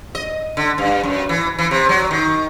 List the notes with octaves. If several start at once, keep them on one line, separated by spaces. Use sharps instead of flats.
D#5
D3
G2
F#2
E3
E3
C3
F#3
D#3